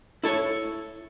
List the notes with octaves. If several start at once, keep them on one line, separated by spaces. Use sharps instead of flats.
E4 A4 C#5